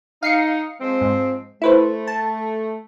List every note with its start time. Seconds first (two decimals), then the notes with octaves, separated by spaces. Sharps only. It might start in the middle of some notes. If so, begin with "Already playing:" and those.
0.23 D#4 F5 C7 C#7
0.81 F3 G#3 C4
1.01 G#2
1.62 A3 E4 B4 C5
2.07 A5